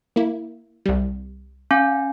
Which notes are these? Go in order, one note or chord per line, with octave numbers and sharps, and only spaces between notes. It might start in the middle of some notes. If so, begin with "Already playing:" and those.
A#3 E4
C2 G3
C#4 F5 G#5